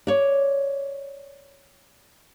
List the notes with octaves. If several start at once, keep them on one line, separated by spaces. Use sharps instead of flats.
C#5 D5